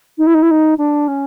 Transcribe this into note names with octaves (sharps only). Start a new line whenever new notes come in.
D#4
E4
D#4
E4
D#4
D4
C#4